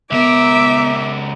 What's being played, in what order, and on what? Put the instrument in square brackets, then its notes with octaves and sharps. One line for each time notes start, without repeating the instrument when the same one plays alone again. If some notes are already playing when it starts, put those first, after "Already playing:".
[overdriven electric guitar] C#2 A#4 [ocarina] B3 [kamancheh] E5 D6